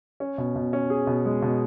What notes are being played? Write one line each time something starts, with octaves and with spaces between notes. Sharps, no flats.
C#4
B2
B2
C#4
G#4
B2
G#3
B2